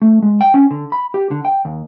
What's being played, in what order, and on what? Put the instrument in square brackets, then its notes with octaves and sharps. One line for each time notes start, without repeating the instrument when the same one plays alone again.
[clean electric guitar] A3
G#3
G5
C#4
D3
B5
G4
D3
G5
D#2